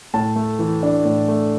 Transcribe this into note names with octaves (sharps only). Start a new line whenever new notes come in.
A2 A5
A3
E3
D4
A2
A3